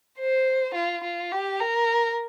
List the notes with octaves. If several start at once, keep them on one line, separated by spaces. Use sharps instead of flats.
C5
F4
F4
G4
A#4